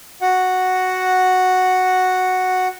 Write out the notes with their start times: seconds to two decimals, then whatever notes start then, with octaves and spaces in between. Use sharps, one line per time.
0.22 F#4 F#5